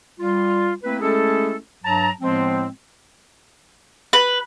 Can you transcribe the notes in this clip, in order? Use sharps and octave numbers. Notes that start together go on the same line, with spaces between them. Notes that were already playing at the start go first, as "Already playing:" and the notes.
G3 F4
A3 A#3 C4 E4 B4
G#3 A3 C#4 E4 G#4 A4
G2 F#3 A5 A#5
A2 F3 G#3 B3 C4
B4